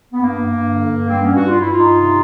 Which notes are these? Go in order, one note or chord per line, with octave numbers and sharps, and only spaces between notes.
B3
G2 A#3
G2
D3
G2
G3 A#3 C4
B3 C#4
G2
F#4
G2 F4
E4
G2 D#4 F4
C3